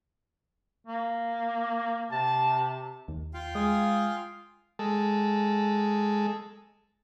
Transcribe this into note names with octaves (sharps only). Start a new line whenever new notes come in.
A#3
C3 A5
D#2
F4 F5 G5
G#3 G#5 D#6
G#3 A4